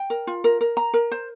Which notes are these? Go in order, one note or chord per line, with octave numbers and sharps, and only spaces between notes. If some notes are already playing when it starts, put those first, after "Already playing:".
Already playing: G5
A#4
F4
A#4
A#4
A#5
A#4
C5